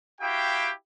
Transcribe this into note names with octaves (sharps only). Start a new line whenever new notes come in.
E4 F#4 G4 F5 G5